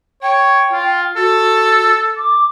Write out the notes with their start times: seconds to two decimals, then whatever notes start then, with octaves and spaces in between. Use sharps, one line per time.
0.23 C#5 G5
0.72 F4
1.16 F#4 A4
2.17 D6